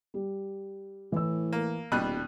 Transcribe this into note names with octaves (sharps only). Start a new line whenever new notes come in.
G3
A2 E3 E6
A#3
D#1 B2 G3 F#6 D#7